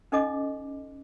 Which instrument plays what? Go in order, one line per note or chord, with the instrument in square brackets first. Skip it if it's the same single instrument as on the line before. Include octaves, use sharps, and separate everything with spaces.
[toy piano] C#4 D#4 A4 D#5 D6